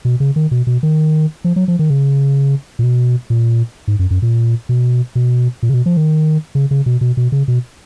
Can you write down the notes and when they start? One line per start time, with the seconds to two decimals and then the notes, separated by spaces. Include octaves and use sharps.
0.05 B2
0.20 C#3
0.36 D#3
0.51 B2
0.67 B2
0.83 D#3
1.44 F3
1.56 F#3
1.68 F3
1.79 D#3
1.90 C#3
2.79 A#2
2.83 B2
3.30 A#2
3.88 G#2
3.99 F#2
4.11 F#2
4.22 A#2
4.69 B2
5.15 B2
5.63 A#2
5.70 C#3
5.74 B2
5.86 F3
5.97 D#3
6.55 C#3
6.71 C#3
6.86 B2
7.01 B2
7.17 B2
7.32 C#3
7.48 B2